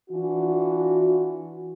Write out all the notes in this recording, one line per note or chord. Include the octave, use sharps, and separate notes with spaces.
E3 D4 F4 F#4